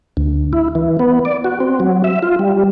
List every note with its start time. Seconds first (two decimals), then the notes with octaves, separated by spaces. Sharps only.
0.17 D2
0.53 E4
0.75 E3
0.99 B3
1.25 D5
1.44 F#4
1.60 C4
1.80 F#3
2.04 E5
2.23 F4
2.39 G3